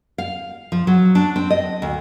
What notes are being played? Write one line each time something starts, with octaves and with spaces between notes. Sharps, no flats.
F5
F3
F#3
D4
C4
D#5
D2